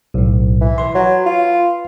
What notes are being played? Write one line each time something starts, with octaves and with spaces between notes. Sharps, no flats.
B1 A2
E3
B4 C6
F#3
F4